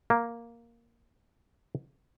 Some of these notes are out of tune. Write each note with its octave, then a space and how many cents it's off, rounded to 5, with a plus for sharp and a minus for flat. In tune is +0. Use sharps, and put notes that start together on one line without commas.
A#3 +0